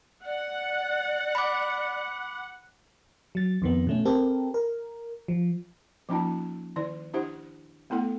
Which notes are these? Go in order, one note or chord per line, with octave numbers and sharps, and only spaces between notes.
D5 F#5
B5 D6
F#3 A6
F2 D#3 B3
B2 A3 C#4
C4 G4 A4 A#4
A#4
F3
F3 A#3 C#4 D#4 F4 A5
D#3 E4 D5
D4 E4 G4 C5 F#5
A3 B3 E4 A4 F#5